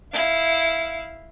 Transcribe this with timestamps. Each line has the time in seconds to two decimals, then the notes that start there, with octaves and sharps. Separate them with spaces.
0.13 E4 F5